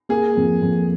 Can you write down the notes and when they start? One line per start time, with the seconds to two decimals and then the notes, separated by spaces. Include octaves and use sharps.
0.09 A#3 G#4
0.36 F2
0.62 F2